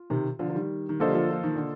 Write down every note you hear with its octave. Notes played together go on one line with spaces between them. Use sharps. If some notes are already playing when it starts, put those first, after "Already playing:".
Already playing: F4
C3 D#3
D3 F3
F3
D#3 G3
D#3
D3 F3 A#3 F4 A4 C5 D#5
G3
D3 F3
F3
D#3
D3